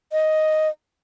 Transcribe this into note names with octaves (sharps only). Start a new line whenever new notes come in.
D#5